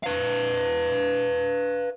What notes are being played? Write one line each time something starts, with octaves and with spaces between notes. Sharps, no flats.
B4 F5